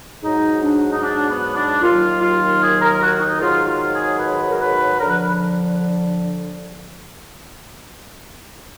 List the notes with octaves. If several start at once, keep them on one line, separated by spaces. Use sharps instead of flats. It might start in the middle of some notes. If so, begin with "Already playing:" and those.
G#2 F#3 D#4
D4
D#4
D4
B3
D4
D#2 D#3 F#3 F4
F4
G#4
A#4
F#4
D#4
G#2 D#3 F#3 F4
F4
G#4
B4
G#4
A#4
B4
D3 F3 A#4
B4